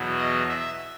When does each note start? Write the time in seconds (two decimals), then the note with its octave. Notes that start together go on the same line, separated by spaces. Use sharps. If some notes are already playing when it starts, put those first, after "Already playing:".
Already playing: E2 B2 F#3
0.17 D#5
0.49 E5